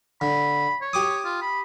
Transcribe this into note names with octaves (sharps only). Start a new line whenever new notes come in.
D3 B5
C#5
G4 D6 D#6
F4
B5